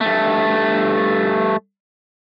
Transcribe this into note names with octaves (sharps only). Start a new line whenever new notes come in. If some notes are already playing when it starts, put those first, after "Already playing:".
G2 A3